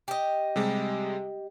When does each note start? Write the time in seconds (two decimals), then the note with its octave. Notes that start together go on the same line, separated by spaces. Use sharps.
0.08 G4 D#5
0.56 C3 G3 G#3